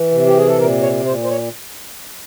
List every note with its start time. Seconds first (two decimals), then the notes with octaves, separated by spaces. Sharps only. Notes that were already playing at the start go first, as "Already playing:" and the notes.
Already playing: E3
0.11 C3
0.27 G4
0.37 G#4
0.47 A4
0.59 A#2 A#4
0.82 C#5
1.06 A#2 C5
1.24 C5
1.30 C#5